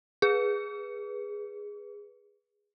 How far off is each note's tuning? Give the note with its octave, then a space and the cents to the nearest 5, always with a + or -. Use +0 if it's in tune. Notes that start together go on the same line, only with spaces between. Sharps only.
G#4 -10 B4 -15